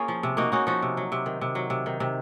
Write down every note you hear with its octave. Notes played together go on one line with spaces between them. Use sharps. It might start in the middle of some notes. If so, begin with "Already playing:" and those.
Already playing: A#3 C#4 F4 G#4
F3
C3
A#3 D#4 F#4
C#4 D#4 F#4
F3 D#4 F#4
C3
F#3
C3
D#3
C3
F#3
C3
D#3
C3